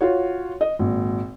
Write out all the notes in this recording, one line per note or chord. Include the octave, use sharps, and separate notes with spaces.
F4 F#4 C#5
D#5
G#1 A#2